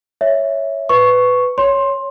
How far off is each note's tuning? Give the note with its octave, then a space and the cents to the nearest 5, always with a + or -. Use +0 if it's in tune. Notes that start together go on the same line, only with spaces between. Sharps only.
C#5 +0 E5 +0
B4 +15 C#6 +0
C#5 +0 C6 +15